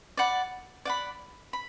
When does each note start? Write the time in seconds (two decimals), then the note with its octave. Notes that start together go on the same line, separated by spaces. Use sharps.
0.17 D5 F#5 B5
0.85 D5 F#5 B5
1.53 B5